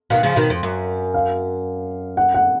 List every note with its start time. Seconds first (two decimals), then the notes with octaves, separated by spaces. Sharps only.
0.10 B2 D#3 F5
0.23 C#3 F3
0.36 B2 D#3
0.50 F2
0.63 F#2
1.14 F5
2.17 F#5
2.34 F#5